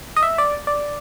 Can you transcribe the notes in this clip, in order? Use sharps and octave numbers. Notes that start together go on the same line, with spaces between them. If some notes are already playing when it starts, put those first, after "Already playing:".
D#5
E5
D5
D5